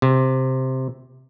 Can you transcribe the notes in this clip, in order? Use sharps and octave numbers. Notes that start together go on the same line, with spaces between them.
C3